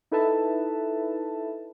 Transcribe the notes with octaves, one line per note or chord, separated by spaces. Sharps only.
D#4 E4 A4 B4 E5 A5